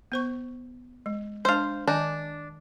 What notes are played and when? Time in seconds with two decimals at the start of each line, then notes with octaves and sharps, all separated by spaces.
0.12 B3 C5 C#6
1.06 G#3
1.45 G#3 D4 C5 F5
1.88 D#3 D4 D#5 G#5